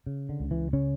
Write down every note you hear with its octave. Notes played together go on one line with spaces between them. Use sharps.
C#3
D3
C#2
E3
C#3 C#4